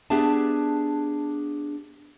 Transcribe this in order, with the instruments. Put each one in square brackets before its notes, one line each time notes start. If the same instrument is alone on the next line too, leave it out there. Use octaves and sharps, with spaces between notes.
[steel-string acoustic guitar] B3 D4 G4 G#4 E5 A5